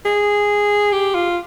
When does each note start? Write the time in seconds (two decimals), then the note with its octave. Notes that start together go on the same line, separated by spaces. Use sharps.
0.05 G#4
0.93 G4
1.15 F4